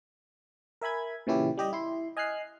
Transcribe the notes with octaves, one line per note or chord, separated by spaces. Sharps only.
A#4 E5 G#5 B5 G#6
A#2 C#3 E3 C#4 E4 G4
G3 G4 D#5
E4 C6
D#5 G#5 F6 F#6 C7